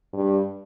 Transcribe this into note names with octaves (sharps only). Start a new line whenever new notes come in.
G2